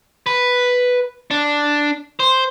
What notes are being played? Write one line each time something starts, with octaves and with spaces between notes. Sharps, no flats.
B4
D4
C5